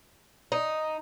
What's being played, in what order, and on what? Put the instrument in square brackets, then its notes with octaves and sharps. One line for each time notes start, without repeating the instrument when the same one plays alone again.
[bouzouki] D#4